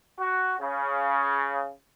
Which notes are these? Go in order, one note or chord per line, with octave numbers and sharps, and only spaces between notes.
F#4
C#3